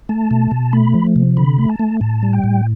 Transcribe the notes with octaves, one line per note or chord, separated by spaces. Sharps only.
A3 A5
B2
B2
A3 B5
F3
C3
D3 B5
A3
A5
A3
A2 A5
G3
G5
A2